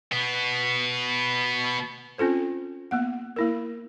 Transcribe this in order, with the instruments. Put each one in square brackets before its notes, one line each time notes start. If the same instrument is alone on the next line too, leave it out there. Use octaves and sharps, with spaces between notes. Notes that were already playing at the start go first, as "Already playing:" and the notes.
[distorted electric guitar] B2 B3
[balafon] C4 C#4 F4 A4 C5
A#3 B3 F#5
A#3 E4 A#4